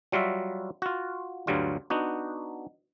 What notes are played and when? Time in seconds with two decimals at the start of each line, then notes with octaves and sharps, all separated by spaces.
0.12 F#3 G3 F4 F#4 E5
0.82 F4 F#4
1.47 D2 G2 F#3 G3 F4
1.90 B3 D4 D#4 F#4